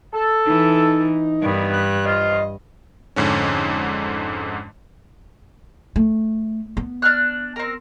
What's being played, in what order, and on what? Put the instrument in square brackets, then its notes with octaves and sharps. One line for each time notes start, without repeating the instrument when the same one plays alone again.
[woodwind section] A4
[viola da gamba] E3 [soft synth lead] D#4
[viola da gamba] G2 [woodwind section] D#3 B3
[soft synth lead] F#6
[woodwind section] F3 F4 [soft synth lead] D#5
[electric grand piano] F2 G#2 D3 C#4
[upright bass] A3
B3
[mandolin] D4 F6 F#6
C4 A#4